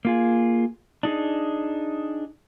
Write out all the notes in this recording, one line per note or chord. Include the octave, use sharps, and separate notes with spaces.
A#3 F4 G#4
D4 D#4 G#4